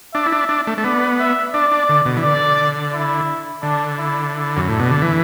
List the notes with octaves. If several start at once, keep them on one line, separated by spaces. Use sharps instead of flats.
D4 E5
E4
D4
D4
A3
A3
B3 D5
E5
D4 D5
D4
D3
B2
E3
D3 D5
E4
D3 D4
E4
E4
F#2
A2 D4
B2
D3
E3